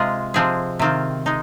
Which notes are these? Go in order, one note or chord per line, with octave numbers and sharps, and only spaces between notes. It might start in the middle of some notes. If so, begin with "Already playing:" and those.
Already playing: C3 G#3 F4 G#4
C3 F3 G#3 C4 G#4
C3 D#3 C4 F4
G#3 D#4